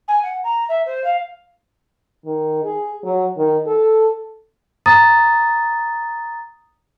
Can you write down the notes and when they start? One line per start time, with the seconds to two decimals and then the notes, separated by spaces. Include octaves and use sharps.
0.07 G#5
0.22 F#5
0.43 A#5
0.68 E5
0.85 C5
1.03 F5
2.25 D#3
2.64 G#4
3.04 F#3
3.37 D#3
3.66 A4
4.86 A#5 D#6 A6